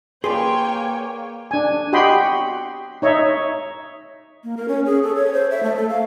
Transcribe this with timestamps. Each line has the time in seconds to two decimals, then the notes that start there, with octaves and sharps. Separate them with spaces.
0.24 A#3 G#4 B4 C#5 D5 G5 G#5 C6
1.51 D4 G#5
1.93 F#4 G4 D#5 G5 B5 C6
3.02 D#4 C#5 D#5 E5
4.44 A#3
4.57 A#4
4.68 C#4
4.86 G#4
5.03 A4
5.15 C#5
5.33 C5
5.51 E5
5.63 A3
5.76 A4
5.89 F5